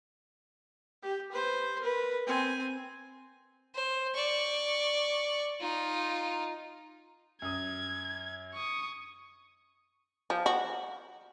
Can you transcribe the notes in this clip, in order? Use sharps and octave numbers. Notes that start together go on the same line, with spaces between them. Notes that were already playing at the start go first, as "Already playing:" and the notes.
G4
B4 C5
A#4 B4
C4 G#5
C5
D5 C#6
D#4 F4
F#2 D#6 G#6
C#6 D#6
F3
F#4